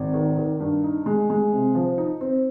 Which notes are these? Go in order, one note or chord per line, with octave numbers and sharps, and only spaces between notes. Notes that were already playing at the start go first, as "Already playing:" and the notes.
Already playing: G#1
D#3
D#3
G2
D#4
G#3
G#3
C3
F3
D#4
C4